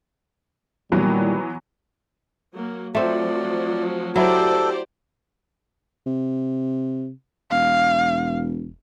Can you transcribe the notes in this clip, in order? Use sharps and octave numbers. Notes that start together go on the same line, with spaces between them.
A#2 D#3 E3 F#3 G3 B3
F#3 A#3
F3 F#3 A3 C4 D5
F#3 E4 G4 A4 C5 D5
C3
E1 F5